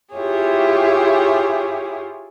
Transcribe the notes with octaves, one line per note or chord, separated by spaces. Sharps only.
E4 F4 G4 G#4 C#5